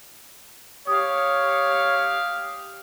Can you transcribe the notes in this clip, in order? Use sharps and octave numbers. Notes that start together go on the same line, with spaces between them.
G4 C#5 F5 D#6